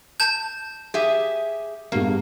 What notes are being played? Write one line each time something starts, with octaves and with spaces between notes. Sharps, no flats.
A5 G6
G4 G#4 E5
G2 G#3 A#3 B3